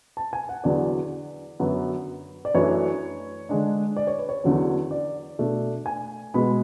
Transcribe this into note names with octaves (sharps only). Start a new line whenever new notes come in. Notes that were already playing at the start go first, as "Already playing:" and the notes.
A5
G#5
F#5
E2 D3 F#3 D5
F#2 D3 F#3 B3
D5
F#2 E3 A3 D4 C#5
D3 G#3 D4
D5
C#5
B4
C#5
E2 D3 F#3 C#4
D5
B2 A3 D4
G#5
B2 G#3 B3 B5